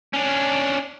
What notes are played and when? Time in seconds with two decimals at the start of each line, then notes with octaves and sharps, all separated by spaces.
0.14 C#4 D4